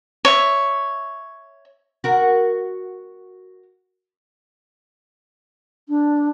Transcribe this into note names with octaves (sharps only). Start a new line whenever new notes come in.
C#5 E5
F#4 A#4
D4